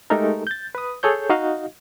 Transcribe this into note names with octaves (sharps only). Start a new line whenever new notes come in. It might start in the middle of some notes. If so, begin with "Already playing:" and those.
G#3 A3 D#4 G4 A4 A#4
G6 A6
B4 D#6
G#4 A4 C#5 G6
D#4 F#4 D#5 F5